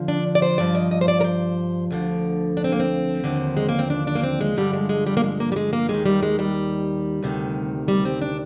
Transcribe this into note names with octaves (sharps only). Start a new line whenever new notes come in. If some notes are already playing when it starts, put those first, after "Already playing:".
Already playing: F2 D3 F3
D4
D5
C5
G2 F3 D5
D#5
D#5
C5
D5
A#4
C5
D2 D3 F3
D4
C4
A#3
C4
D#2 D3 F3
G#3
A#3
C4
D4
D4
A#3
C4
G#3
G2 D3 F3 G3
G#3
G#3
G3
A#3
G#3
A#3
G3
G#3
A#3
D#2 D#3 G#3
G3
G#3
G3
D2 C3 D#3
G3
C4
D4